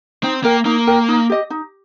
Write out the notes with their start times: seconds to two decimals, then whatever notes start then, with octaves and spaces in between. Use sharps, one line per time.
0.23 C4 D#4
0.44 A#3 A#4 G5
0.65 A#3 D#4
0.87 A#4 G5
1.08 D#4
1.30 G4 D#5
1.50 D#4